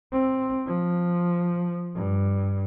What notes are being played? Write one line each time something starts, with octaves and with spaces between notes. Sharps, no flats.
C4
F3
G2